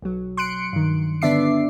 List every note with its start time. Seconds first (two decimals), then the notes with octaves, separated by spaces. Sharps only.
0.02 B1 F#3
0.37 C6 F#6 C#7 D7
0.73 G2 D#3
1.22 D3 B3 D4 E5 D6 C7